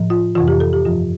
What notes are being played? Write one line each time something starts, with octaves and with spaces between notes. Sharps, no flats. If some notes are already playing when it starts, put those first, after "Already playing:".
Already playing: A2 F3
F4
F2 C3 E3 F4
G4
A4
G4
G2 F3 F4